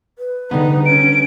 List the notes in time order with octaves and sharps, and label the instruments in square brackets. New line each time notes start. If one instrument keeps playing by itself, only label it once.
[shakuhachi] B4
[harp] D3 G3 B3 [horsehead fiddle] D#4
[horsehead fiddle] C#4 [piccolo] D7